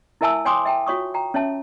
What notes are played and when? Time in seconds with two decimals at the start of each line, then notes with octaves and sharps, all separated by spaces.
0.21 E4 A#4 E5 G#5 A5 E6
0.45 C#5 G5 G#5 C6 D6 D#6
0.65 E5 G5 A5
0.87 F4 F#4 C#5 C#6 D#6
1.14 G5 A#5
1.34 C#4 C#5 E5 A5